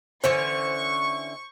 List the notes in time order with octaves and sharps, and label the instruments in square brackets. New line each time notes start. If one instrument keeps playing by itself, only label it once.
[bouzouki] D3 E3 C#4 [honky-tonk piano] C5 [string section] C#6